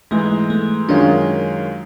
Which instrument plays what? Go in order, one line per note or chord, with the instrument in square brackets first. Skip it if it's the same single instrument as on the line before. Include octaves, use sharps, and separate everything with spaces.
[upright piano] G#2 E3 G#3 [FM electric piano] A3
[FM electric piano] A3
[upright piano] F#2 D#3 G#3 C#4 F4 [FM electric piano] D4